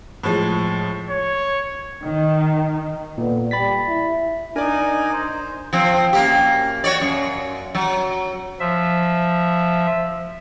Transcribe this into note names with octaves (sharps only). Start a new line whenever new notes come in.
A2 F3 G#3
C#5
D#3
A#2 D3 B3
G3 B5 A6 B6
E4
D4 D#4 A#4 D5 G#5
C5
F3 C4
F#2 A#3 G4
F#4 C#5 D5
F#2
F#3
F3 E5